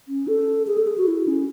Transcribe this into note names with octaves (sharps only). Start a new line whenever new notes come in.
C#4
A4
G#4
A4
G#4
F#4
E4
C#4